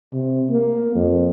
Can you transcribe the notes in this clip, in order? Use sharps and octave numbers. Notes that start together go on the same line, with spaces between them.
C3
A#3
F2